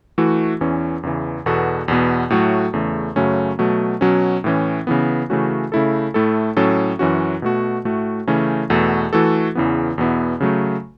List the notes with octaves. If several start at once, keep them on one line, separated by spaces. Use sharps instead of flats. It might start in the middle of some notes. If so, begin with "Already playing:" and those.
E3 A3 F#4
E2 E3 C#4
E2 C#3 E3
E2 B2 B3 F#4 A4
E2 B2 B3
A2 F#3 A3 F#4
E2 C#3 A3
F#2 C#3 F#3 A3 C#4
B2 F#3 A3
B2 F#3 C#4
A2 E3 C#4
C#3 E3 B3
C#3 E3 A3 C#4 F#4
C#3 A3 E4 A4
A2 A3 E4 A4
A2 F#3 C#4 A4
F#2 E3 C#4 F#4
B2 A3 F#4
A2 A3 F#4
C#3 E3 A3 C#4
E2 B2 A3 F#4 A4
E3 A3 F#4 A4
E2 C#3 E3 B3
E2 B2 B3 E4
C#3 F#3 A3